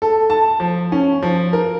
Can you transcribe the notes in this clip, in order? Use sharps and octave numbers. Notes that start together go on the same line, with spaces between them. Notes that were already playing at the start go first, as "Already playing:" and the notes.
A4
A5
F3
C#4
F3
A#4